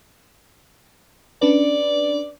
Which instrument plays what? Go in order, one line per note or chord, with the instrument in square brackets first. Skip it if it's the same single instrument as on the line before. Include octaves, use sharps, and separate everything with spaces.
[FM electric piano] C#4 D4 B4 [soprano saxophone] D5